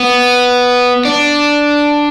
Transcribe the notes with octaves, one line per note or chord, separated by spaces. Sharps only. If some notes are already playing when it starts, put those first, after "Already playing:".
Already playing: B3
D4